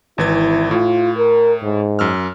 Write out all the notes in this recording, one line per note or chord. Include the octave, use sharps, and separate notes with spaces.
G#1 E3 E4 G#6
A2 F4
A#4
G#2
F#2 E6 F6